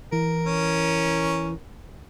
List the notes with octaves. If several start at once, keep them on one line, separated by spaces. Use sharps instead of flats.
E3 A#4
C#4